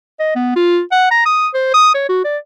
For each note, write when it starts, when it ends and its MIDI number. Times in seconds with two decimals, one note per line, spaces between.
0.20 0.34 75
0.36 0.54 59
0.56 0.80 65
0.92 1.08 78
1.11 1.24 82
1.26 1.48 87
1.54 1.71 72
1.74 1.94 87
1.95 2.06 73
2.09 2.21 66
2.25 2.38 74